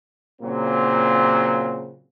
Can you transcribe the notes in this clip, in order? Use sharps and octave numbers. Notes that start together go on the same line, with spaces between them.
A#2 C#3 F#3 A#3 C4